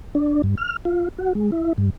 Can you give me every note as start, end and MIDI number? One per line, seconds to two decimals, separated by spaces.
0.15 0.42 62
0.43 0.55 43
0.58 0.76 89
0.85 1.09 65
1.18 1.33 66
1.35 1.51 56
1.52 1.73 64
1.78 1.90 43